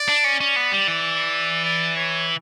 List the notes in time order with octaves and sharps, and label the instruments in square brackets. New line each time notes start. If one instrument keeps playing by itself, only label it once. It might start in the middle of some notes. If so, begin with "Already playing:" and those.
Already playing: [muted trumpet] D5
[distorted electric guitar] D4
C#4
[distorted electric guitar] C#4 [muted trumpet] D5
[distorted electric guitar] B3
G3
E3
[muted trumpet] D5
C#5